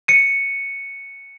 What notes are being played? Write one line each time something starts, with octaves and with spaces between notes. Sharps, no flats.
C#7 D#7